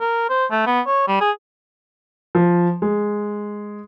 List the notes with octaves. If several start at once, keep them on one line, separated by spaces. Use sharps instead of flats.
A#4
C5
A3
B3
C#5
G3
G#4
F3
G#3